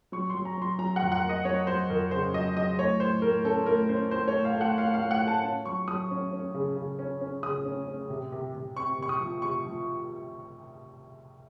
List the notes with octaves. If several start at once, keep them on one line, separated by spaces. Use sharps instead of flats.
F#3 C#6
F#3 C6
A#5
F#3 C6
F#3 A#5
F#5
F2
F#5
A#3
D#5
F#3 C#5
F#3 C5
F2 A#4
C#3 C5
F#3 D#5
F#3 D#5
A2 C#5
A2 C5
A2 A#4
C#4 A4
A2 A#4
C#4 C5
A2 C5
A2 C#5
F5
A3
F#5
A2 F5
F5
A2
F#5
A3
A5
C#4
F#3 C#6
F#3 D#6
C#4
C#4
C#3
C#3
C#4
C#4
C#3 D#6
C#4
C#4
C3
C3
C3
C4 C#6
C3 C#6
D#6
F3
C3 C#6
F3